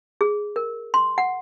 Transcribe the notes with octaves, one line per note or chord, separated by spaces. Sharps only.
G#4
A#4
C6
F#5